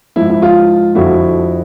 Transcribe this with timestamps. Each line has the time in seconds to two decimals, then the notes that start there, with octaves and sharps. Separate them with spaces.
0.16 G#2 F3 E4
0.29 E4
0.42 F4
0.95 F2 D3 F3 E4 F#4